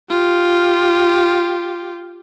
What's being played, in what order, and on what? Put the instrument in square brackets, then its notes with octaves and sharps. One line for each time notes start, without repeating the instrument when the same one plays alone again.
[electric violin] F4 G4